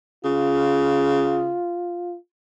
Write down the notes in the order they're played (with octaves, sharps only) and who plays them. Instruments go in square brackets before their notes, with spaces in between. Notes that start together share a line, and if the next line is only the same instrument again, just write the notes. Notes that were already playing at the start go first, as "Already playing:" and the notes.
[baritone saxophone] C#3 [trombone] F4